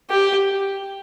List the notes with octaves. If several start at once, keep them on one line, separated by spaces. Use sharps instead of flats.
G4